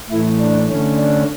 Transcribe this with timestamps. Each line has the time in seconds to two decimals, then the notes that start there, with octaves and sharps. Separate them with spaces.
0.10 A2 E3 A3 E4
0.40 D4
0.69 D3 A3 C#4
0.98 D4